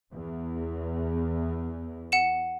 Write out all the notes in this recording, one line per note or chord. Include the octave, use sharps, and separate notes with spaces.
E2
F#5 C#7 E7